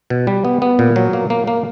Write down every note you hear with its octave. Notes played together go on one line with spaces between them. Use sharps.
B2
G3
B3
B3
A#2
F#3
A#3
A#3
A#3